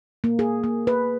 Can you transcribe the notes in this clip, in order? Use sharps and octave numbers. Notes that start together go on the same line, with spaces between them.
A#3
G#4
A#3
B4